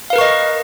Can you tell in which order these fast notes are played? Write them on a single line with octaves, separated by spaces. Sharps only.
F5 B4 A#4 C#6 D#5